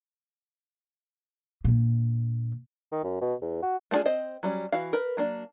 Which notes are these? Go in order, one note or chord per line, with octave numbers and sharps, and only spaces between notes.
A#2 D3
D#3
F#2
B2
E2
F#4
A3 B3 D4 F4 G#4
C4 C5 D#5
F#3 G3 C#4
E3 F#4 F5
A#4 B4
F#3 A#3 D4